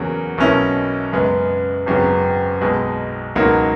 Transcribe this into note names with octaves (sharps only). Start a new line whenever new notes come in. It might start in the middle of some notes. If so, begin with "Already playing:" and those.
Already playing: E2 C#3 F#3 A#3 C#4
B1 B2 A#3 C#4 E4
F#2 C#3 G#3 B3
G#1 F#2 C#3 F#3 B3
B1 B2 G#3
C#2 B2 F#3 A#3 D#4